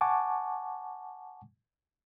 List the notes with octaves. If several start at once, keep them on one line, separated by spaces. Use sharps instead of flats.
F#5 G#5 A5 C#6 D6